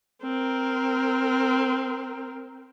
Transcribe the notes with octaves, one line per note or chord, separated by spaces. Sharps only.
C4 A#4